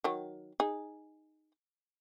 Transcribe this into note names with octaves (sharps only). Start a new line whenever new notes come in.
D#3 F#3
D#4 G#4